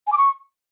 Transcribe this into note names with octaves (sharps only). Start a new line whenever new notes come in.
G#5
D6
C#6